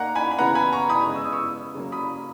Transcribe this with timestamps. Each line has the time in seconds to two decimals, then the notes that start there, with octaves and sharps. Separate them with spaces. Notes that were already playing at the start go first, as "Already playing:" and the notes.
Already playing: D#3 A#3 F#5 A#5
0.15 G#5 B5
0.31 B5
0.39 C#3 E3 B3 F#5 A#5
0.55 G#5 B5
0.73 A#5 C#6
0.89 B5 D#6
1.07 C#3 G#3 B3
1.16 E6
1.25 D#6
1.33 C#6 E6
1.75 C#3 F#3 A#3
1.92 B5 D#6